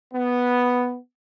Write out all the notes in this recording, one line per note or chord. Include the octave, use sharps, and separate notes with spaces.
B3